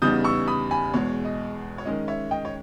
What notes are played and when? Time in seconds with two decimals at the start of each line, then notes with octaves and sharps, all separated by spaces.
0.02 E2 C#3 G3 B3 D#4 D#6 G6
0.24 C#6 E6
0.48 B5 D#6
0.71 G#5 B5
0.94 E2 B2 G#3 C#5
1.25 D#5
1.78 C#5
1.86 D#3 G#3 C#4 D#5
2.08 C#5 E5
2.31 D#5 G5
2.45 C#5